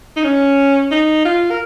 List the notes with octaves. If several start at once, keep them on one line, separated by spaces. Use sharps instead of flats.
D#4
C#4
D#4
F4
A#4